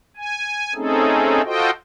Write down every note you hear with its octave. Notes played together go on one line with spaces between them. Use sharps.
G#5
A3 C4 C#4 D#4 G#4 A4
F4 F#4 A4 C5 D#5 G5